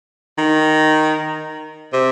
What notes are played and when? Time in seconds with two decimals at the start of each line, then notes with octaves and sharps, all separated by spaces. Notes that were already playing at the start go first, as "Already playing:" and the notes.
0.38 D#3
1.93 C3